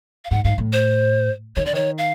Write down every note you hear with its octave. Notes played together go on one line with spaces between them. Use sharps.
F5
G#2 F#5
G#2 F5
A2
C5
D#3 C#5
D3 D5
D#3 C#5
F5